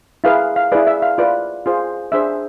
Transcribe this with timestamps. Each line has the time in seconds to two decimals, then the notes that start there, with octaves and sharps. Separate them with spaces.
0.24 E4 G#4 B4 F5
0.56 F5
0.72 E4 G#4 B4 D5
0.87 E5
1.02 F5
1.18 F4 B4 D5
1.66 F4 G#4 C5
2.12 D4 G#4 C5 E5